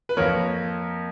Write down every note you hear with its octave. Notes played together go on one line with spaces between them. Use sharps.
B4
F2 F3 A#3 A#4 C#5